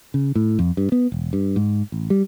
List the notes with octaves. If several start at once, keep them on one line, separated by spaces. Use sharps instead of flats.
C#3
A2
F2
G2
B3
E1
G2
G#2
A1
G3